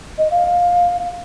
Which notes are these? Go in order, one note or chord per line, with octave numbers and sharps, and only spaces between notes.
D#5
F5